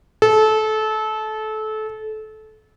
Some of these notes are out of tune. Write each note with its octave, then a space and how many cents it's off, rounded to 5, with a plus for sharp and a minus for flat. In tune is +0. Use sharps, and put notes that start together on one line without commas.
A4 -25